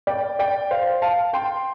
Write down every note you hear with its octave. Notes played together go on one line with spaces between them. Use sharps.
D5 G5
D5 G5
C5 F5
F5 A5
G5 C6